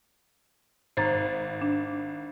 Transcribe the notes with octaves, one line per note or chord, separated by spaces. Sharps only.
G#1 C5 A#5 A6
D4